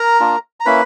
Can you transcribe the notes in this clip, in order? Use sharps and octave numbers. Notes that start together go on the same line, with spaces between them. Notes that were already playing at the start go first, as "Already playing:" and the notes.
Already playing: A#4 A#5
A#3 D4 F4
A#5
A#3 C#4 E4 B4 B5